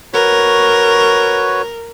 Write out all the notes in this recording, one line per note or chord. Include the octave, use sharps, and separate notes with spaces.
F#4 A#4 B4 C#5